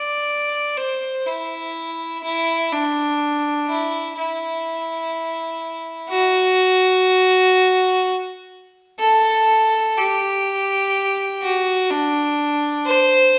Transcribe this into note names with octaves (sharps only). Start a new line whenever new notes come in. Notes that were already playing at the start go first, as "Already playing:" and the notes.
Already playing: D5
C5
E4
E4
D4
E4
E4
F#4
A4
G4
F#4
D4
C5